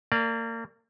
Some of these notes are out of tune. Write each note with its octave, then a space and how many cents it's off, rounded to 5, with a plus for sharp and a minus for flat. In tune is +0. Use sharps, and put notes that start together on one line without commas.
A#3 -30 D5 +0